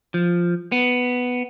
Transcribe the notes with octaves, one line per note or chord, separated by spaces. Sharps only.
F3
B3